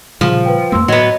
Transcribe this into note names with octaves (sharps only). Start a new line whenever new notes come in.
A#2 C#3 F3 G3 G#4
B4 G5
F2 A3 A#3 C6 E6
A2 F#3 B3 D#5